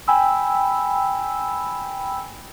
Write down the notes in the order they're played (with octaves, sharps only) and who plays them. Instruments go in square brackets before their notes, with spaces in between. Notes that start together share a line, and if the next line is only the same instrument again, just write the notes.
[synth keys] G5 G#5 B5 E6